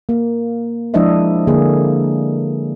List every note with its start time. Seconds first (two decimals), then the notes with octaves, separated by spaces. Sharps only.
0.09 A#3
0.94 F3 G#3 D4 E4 D#5 E5
1.47 D3 A#3 G#4